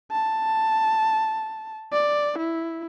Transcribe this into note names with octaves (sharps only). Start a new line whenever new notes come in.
A5
D5
E4